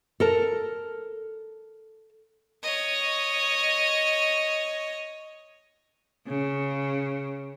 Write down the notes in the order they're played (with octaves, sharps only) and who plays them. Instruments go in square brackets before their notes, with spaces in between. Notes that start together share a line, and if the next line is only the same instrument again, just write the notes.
[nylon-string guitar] A4 A#4 A5
[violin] C#5 D#5
[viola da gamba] C#3